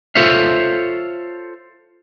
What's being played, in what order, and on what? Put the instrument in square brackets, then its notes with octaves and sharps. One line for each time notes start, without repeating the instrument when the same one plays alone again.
[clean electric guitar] F4 A4 C5 C#5 E5 F5